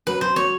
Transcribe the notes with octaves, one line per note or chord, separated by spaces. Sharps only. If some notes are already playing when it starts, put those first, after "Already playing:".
F#3 B4
F#3 C5
F#3 C#5